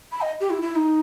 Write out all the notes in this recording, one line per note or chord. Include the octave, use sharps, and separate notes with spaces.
B5
D#5
G4
E4
E4
D#4